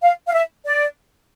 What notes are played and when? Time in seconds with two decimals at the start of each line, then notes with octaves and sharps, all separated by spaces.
0.01 F5
0.28 F5
0.33 E5
0.65 D5